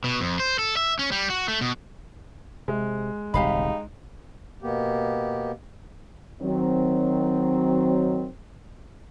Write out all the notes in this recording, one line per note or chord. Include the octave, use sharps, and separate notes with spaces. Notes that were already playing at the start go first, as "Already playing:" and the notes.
B2
F2
C5
A4
E5
C#4
G3
F#4
A3
B2
C3 G#3
D#1 C2 C#3 D#4 G4 F5 B5
B2 A#3 B3 G4
D#3 F#3 C4